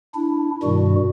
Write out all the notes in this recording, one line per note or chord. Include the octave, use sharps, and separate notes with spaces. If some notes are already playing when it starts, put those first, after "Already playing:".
D4 E4
G2 B2 D#3 G3 F#4